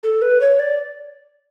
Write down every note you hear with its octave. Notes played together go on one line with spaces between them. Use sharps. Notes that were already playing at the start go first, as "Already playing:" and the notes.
A4
B4
C#5
D5